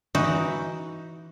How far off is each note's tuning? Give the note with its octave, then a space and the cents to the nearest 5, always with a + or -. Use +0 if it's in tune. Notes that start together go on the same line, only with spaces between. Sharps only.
E3 +0 D#4 +10 F#4 +0